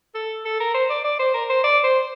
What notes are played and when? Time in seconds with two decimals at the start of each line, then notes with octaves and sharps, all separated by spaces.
0.14 A4
0.45 A4
0.60 A#4
0.74 C5
0.90 D5
1.04 D5
1.19 C5
1.34 A#4
1.49 C5
1.64 D5
1.84 C5